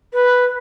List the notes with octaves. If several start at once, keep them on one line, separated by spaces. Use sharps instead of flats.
B4